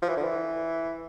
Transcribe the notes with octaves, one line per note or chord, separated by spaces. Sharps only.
F3
E3
D3
E3